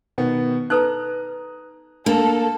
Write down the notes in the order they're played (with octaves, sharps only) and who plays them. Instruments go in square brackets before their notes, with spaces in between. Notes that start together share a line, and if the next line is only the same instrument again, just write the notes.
[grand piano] B2 D#3 B3
[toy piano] D#4 A4 B4 [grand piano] A#5 D#6 F#6
[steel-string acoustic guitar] A#3 [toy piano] D4 [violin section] A4